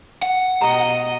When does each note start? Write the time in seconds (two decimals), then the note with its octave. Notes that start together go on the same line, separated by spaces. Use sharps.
0.22 F#5
0.61 B2 G4 D#5 A#5